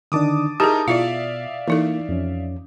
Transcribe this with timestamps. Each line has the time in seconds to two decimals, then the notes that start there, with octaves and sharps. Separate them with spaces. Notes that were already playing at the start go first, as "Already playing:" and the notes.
0.12 D3 D#3 D4 A5 D6 D#6
0.60 D#4 E4 G4 G#4 A#4 A5 A#5 D#6
0.88 B2 E4 F4 D5 E5 F5
1.68 E3 A#3 D#4 E4 A4
2.09 F2 C#4